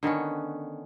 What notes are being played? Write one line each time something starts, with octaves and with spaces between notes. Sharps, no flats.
D3 D#3 B3 C#4